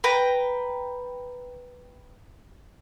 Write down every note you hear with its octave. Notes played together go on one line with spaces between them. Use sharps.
B4 G5 A#5